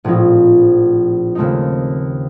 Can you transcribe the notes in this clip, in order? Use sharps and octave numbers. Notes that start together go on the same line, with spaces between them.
A#1 A2 F3 C4 D#4
D#2 C#3 A3 C4 D#4